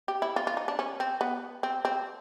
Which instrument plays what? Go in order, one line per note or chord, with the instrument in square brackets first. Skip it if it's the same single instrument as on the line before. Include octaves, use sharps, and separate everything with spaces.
[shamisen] G4
E4
F4
F4
D#4
D4
C#4
C4
B3
C4
C4